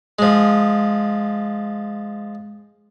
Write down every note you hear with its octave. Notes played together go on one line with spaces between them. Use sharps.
F3 G#3